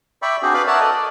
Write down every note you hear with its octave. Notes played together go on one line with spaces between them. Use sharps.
D5 E5 G5 B5 C#6
C4 D4 F#4 G#4 C5
B4 D5 F5 B5
A#4 C#5 D5 E5 F#5 A5
A4 D5 D#5
D5